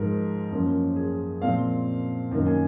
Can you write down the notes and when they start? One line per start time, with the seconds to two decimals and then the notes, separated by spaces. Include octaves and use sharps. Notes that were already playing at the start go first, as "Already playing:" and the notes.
Already playing: G#2 F3 G#3 A#4
0.51 F#2 F3 A#3 C#4
0.96 G#4
1.41 A#2 F3 C4 F5
2.31 F#2 D#3 A#3
2.47 G#5